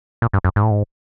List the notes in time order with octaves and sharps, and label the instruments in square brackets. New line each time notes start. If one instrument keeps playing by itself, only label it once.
[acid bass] A#2
G2
F#2
G#2
A2
G#2